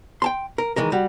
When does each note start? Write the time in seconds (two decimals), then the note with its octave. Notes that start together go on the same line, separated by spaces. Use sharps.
0.22 G5 A5 C6
0.58 A#4
0.76 D#3 E3 G#3 A#4
0.92 G3 F#4